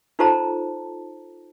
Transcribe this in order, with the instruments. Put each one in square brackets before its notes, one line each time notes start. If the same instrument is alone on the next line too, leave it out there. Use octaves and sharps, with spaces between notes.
[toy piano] D#4 F4 A4 C5 A5 A#5